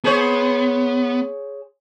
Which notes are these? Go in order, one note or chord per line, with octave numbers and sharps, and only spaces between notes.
B3 G#4 C5 C#5